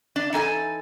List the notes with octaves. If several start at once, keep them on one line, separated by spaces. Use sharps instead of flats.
D4
E3 D#4 A4 G#5